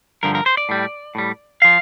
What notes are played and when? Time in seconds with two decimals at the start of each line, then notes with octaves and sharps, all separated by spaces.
0.23 G2 D3 F3 A#4
0.35 A#4
0.46 C5
0.57 D5
0.69 A2 G3
1.15 A2 G3
1.62 F3 F5